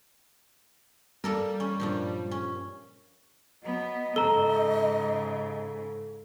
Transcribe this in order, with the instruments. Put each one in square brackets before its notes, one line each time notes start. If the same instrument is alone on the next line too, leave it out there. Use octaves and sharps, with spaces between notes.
[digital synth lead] G3 [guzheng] A#3 A4 A#4
[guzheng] C#4
G2 A#2 F3
C#4
[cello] F#3 B3 [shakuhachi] D#5
[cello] G#2 C#3 [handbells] A4 [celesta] A#5 G7